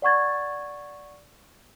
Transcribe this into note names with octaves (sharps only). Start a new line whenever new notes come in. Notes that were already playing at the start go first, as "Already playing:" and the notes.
D5 F#5 C#6 G#6 A6